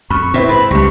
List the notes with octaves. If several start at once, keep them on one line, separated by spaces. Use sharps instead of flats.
F2 B5 C#6
A#2 C4 E4 B4
G#2 B5
C#2 G2 G3 C#6